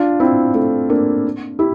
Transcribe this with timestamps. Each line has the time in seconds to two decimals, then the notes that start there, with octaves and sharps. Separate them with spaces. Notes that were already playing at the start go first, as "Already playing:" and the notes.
Already playing: D4 F4
0.20 C4 E4
0.54 A3 C4
0.89 A#3 D4
1.59 E4 G4